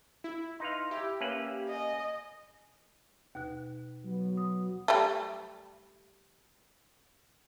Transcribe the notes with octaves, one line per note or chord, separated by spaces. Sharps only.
E4
D#4 B4 F5 C6
E4 G4
A#3 C#4 B4 E5
D#5 G#5
D#2 B2 F#6
F#3 B3 F#4
D#6
G3 A3